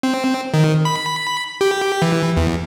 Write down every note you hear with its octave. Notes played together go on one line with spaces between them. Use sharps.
C4
D#3
B5
G4
E3
E2